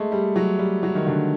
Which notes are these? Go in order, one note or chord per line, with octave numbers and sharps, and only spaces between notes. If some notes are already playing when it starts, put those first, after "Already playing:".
Already playing: G#3 A3
G3
F#3
G3
F#3
D#3
D3